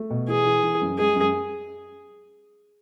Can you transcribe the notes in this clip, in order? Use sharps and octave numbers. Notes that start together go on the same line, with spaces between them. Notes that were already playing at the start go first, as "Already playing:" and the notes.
Already playing: A3
B2
E3 G#4
E3
E3
F#2
G#3 G#4
F#2